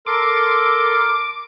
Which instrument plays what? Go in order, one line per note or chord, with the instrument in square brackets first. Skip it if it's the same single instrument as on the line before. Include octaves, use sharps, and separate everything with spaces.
[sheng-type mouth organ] A4 A#4 C6 [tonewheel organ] D6